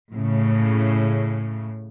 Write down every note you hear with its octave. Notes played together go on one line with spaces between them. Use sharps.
A2 C#3